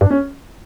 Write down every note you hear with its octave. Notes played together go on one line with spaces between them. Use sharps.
G2 D4
C#4